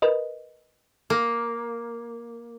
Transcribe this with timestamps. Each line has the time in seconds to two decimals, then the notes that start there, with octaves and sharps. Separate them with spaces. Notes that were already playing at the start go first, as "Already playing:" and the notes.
0.02 A#4 B4 D#5
1.10 A#3